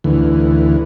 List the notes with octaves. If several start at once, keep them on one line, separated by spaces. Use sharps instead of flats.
D2 E3